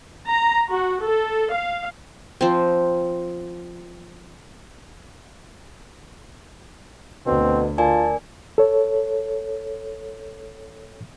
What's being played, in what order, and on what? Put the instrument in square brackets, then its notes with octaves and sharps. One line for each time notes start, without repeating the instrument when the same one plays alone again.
[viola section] A#5
F#4
A4
F5
[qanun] F3 C4
[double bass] D2 [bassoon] B2 [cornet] C4
[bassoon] F4 [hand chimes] A#4 D5 G#5 [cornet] A5
[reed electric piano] A4 C#5